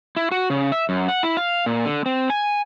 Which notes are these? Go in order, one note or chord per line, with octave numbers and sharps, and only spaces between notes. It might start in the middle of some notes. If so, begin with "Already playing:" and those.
E4
F#4
C#3
E5
F#2
F#5
E4
F5
A#2
D3
C4
G#5